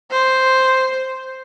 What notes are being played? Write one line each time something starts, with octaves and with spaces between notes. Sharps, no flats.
C5